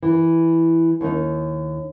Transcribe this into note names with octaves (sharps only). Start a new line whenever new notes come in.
E3
D#2 D#4